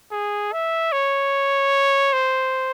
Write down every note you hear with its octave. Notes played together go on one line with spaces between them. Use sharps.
G#4
E5
C#5
C5